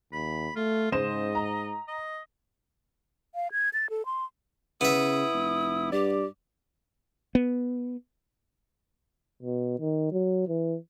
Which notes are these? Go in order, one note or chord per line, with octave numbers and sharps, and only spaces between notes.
D#2 B5
A3 F4
G#2 C#3 C5 D#5 E7
A#5
D#5
F5
G#6
A6
A4
C6
C#3 B3 E4 E5 D#6
F1
G2 G4 D5
B3
B2
D#3
F#3
E3